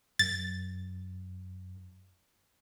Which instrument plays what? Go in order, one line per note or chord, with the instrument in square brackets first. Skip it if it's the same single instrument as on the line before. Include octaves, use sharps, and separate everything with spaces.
[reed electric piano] F#2 [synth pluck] A6